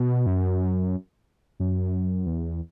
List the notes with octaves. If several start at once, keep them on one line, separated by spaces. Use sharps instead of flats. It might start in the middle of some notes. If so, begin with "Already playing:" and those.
Already playing: B2
F#2
F#2
E2